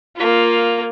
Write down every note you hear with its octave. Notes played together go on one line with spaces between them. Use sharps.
A#3 F4